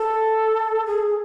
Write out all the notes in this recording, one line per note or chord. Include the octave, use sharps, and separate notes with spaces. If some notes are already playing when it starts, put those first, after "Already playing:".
Already playing: A4
G#4